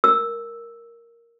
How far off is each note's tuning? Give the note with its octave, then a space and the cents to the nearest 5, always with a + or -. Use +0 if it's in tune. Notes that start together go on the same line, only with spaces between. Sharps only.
A#4 +0 E6 +0